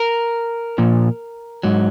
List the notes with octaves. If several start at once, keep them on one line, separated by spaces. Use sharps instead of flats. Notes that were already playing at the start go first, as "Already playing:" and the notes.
Already playing: A#4
A#2 F3
G#2 F#3